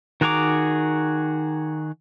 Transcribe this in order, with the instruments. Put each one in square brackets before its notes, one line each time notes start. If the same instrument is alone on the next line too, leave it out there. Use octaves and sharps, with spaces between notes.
[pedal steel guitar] D#3 F#4 G#4 A#5 D6